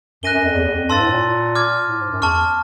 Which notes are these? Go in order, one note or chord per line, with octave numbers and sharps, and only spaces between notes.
F#2 F#6 A#6 D#7 G7
F#2
F2
E2
E2
F2
G2 A5 C6 E6 A6
A2
A#2
D6 F6 G#6
A2
G#2
F#2
E2 A5 C#6 F6